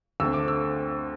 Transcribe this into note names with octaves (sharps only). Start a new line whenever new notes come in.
D2 D3 A3 C4 E6
D6
E6